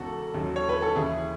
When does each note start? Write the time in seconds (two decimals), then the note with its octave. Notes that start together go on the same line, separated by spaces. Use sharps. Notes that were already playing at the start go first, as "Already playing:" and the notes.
Already playing: E1 E2 C#3 F#4 A4
0.34 D#2 C#3 F#3
0.56 C#5
0.69 B4
0.82 A4
0.95 D#2 C#3 E3 E4 G#4